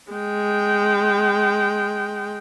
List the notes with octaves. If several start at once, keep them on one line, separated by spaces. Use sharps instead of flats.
G#3 G5